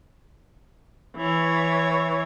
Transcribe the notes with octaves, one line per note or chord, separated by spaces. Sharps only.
E3 C#5